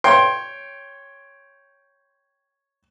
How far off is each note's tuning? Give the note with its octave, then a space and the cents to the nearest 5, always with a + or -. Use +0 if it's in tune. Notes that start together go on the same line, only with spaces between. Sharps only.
C#5 +0 G5 +0 C6 +15